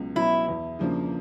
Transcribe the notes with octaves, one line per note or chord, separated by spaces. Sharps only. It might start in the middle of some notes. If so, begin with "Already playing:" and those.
Already playing: C#2 B2 F#3
B2 F#3 E4
E2
C#3 F3 A#3 D4